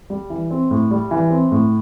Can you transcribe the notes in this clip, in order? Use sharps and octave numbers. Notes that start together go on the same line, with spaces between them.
G3
E3
C4
A2
G3
E3
C4
A2